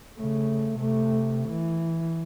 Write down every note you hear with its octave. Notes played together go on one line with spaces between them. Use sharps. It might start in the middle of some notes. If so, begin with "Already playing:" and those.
C#3 A3
C3 A3
E3